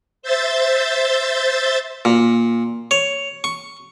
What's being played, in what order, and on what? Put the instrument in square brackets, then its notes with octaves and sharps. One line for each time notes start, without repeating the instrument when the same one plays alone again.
[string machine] C5 E5 G6 A6
[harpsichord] A#2
C#5
C#6